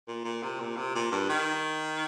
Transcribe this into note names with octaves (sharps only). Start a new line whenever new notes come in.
A#2
A#2
C3
A#2
C3
A#2
G2
D#3